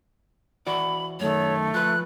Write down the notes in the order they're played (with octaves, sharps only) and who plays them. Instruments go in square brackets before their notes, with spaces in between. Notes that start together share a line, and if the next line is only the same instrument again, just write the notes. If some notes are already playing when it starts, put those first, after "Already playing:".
[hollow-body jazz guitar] E3 F#4 D5 [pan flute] B5
[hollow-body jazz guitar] F#2 D#3 [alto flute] A3 [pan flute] C#5
[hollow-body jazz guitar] F3 B4 [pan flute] F#6